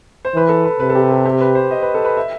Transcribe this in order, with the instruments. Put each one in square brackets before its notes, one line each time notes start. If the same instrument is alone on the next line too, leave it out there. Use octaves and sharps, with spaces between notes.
[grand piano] C5
[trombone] E3 [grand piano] B4
[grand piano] A4
B4
[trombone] C3 [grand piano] B4
[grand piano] A4
G4
A4
G4
B4
C5
D#5
B4
A4
B4
E5